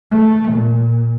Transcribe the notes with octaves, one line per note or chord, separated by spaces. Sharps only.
A3
A#2